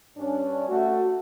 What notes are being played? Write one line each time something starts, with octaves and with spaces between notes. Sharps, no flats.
G2 C#4 D4
A3 F#4